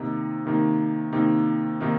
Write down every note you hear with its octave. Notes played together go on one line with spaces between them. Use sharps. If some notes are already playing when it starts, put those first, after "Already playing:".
Already playing: C3 D#3 A#3 D#4
C3 D#3 A#3 D#4
C3 D#3 A#3 D#4
C3 D#3 A#3 D#4